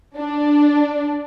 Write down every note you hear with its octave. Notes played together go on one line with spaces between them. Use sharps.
D4